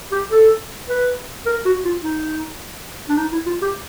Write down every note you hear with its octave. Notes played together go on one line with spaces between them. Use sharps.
G4
A4
B4
A#4
F#4
F4
D#4
D4
D#4
E4
F4
G4